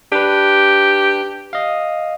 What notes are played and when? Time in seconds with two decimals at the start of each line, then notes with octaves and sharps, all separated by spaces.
0.12 D4 G4 B4
1.53 D#5 F5